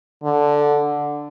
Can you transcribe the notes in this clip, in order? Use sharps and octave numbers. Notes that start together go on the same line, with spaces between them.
D3